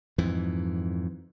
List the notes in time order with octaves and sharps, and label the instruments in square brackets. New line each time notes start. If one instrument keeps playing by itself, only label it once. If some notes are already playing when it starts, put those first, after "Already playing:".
[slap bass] F2 G#2 E3